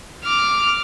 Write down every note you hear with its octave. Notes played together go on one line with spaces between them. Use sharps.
D6 F6